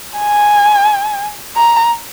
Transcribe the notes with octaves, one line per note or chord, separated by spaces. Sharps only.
G#5
A#5